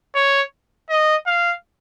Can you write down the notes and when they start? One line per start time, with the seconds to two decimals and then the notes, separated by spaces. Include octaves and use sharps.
0.15 C#5
0.90 D#5
1.27 F5